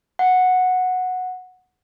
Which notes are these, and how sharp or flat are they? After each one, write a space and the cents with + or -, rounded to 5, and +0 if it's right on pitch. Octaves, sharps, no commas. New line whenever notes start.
F#5 -10